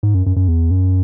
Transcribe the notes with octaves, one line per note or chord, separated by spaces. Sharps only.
G#2
F#2
F#2
F#2
E2
F#2